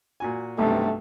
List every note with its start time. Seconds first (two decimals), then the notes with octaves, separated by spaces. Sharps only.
0.20 A#2 F#4 G#5
0.58 B1 G2 C3 A3